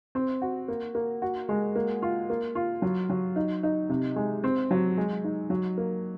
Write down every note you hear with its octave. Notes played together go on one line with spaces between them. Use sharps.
C4
F#4
A#3
A#3
F#4
G#3
A#3
F4
A#3
F4
F#3
F#3
D#4
D#4
C3
G#3
C4
F#3
G#3
D#4
F#3
A#3